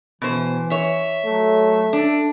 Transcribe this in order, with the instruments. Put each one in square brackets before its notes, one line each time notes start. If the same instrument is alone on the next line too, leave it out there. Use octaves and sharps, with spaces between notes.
[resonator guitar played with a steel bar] B2 C5 [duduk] E3
[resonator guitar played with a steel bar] C#5 [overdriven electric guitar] E5
[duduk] F#3 [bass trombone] A3
[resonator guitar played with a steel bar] D4 [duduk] A4